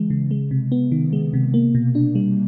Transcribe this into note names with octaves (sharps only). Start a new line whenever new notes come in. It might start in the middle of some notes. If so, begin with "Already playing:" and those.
Already playing: C#3 E3 G#3
C#3
G#3
C3
B3
D#3
G#3
C3
A#3
B2
D4
G3